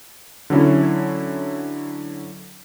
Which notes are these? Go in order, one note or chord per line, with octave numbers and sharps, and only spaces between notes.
D3 F#3 C#4 E4